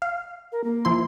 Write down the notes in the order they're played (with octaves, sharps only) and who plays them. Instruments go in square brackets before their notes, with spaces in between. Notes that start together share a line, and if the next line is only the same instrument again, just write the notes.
[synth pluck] F5
[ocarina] A#4
A#3
[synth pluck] F3 E4 C6